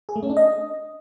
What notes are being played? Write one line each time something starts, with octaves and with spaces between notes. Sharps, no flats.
G#4
A3
C#4
D4
D#5